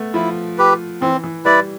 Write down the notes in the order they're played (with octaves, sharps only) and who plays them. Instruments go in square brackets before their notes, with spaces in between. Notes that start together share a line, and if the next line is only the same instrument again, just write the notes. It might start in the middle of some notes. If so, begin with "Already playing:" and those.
Already playing: [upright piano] A3 B3
[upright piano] F3 [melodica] E4
[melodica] G4 B4
[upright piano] E3 [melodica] C4
[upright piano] E3
[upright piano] G3 [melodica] E4 B4 D5